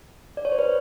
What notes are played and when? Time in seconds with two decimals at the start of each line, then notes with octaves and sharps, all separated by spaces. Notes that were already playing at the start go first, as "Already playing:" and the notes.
0.37 D5
0.45 C#5
0.52 C5
0.59 B4